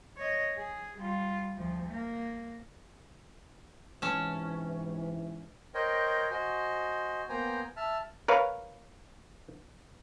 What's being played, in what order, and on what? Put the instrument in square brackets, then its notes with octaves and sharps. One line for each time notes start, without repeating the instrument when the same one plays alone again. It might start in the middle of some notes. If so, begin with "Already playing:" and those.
[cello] C#5 D#5
G#4
G3 F4
D2 F3
A#3
[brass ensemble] G#2 C3 E3 [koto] C#4 A5
[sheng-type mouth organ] A#4 C5 C#5 D#5 G5
F#4 C5 D#5 G#5
A#3 B3 C5 G5 G#5 A#5
E5 A5 F6
[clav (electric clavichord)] A#4 B4 C#5 F5